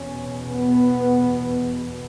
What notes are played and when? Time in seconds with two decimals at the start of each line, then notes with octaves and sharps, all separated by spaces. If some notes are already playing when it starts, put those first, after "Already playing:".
Already playing: E2 B2 C#4
0.49 B3